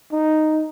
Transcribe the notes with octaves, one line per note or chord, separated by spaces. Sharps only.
D#4